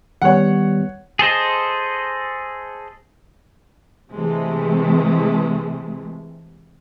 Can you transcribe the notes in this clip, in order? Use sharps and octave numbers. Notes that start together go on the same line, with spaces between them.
D#3 G3 B3 C#5 F#5
G#4 A4 C5 D#5
C3 E3 G#3 A3